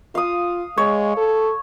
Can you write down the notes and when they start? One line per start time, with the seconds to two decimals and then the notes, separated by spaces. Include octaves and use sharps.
0.15 F4 F5 D#6
0.78 G#3 C#5
1.17 A4